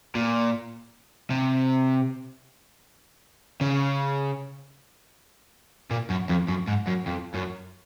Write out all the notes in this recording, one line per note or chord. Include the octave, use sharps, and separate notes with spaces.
A#2
C3
C#3
A#2
F#2
F2
F#2
G#2
F#2
F2
F#2